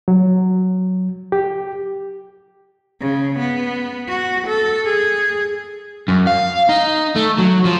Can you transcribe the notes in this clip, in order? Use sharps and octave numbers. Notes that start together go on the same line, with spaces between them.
F#3
G4
C#3
B3
F#4
A4
G#4
F#2
F5
D#4
A3
F#3
F3